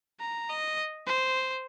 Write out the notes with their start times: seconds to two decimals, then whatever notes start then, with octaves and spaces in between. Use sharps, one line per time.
0.20 A#5
0.49 D#5
1.07 C5